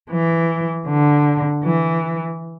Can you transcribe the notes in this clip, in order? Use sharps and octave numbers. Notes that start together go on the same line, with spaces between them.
E3
D3
E3